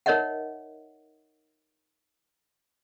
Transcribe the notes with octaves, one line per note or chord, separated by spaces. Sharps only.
D#4 A#4 C#5 D#5 E5 F#5